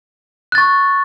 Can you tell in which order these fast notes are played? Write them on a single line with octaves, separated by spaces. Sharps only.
F#6 A6 C#6